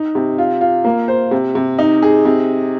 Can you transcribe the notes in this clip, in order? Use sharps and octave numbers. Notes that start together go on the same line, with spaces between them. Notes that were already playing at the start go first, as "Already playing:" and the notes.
Already playing: D#4
C3
F4
F4
A#3
C5
C3
C3
D#4
G#4
C3